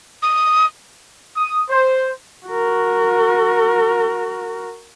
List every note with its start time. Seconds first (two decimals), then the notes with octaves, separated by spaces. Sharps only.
0.23 D#6
1.37 D#6
1.70 C5
2.47 F#4 A#4